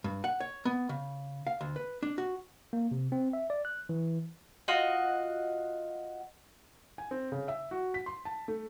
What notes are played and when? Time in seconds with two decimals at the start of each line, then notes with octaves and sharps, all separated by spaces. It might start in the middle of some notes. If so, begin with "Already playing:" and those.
0.04 G2
0.24 F#5
0.40 C#5
0.65 B3
0.89 C#3
1.47 F5
1.61 D2
1.76 B4
2.03 D4
2.18 F#4
2.73 A#3
2.91 C3
3.12 C4
3.33 E5
3.50 D5
3.65 F#6
3.89 E3
4.68 F4 F#4 D#5 F#5
6.98 G#5
7.11 C4
7.32 C#3
7.48 E5
7.71 F#4
7.94 B6
8.06 C6
8.25 A5
8.48 A3